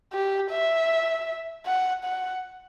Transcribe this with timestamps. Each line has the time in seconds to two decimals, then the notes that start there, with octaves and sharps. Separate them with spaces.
0.13 G4
0.51 E5
1.66 F#5
2.04 F#5